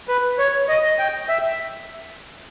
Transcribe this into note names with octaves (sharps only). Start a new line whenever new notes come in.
B4
C#5
D#5
G5
E5